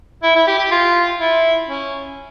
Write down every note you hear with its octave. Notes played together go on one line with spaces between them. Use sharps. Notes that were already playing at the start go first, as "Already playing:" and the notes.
E4
E4
G4
G4
F4
E4
C#4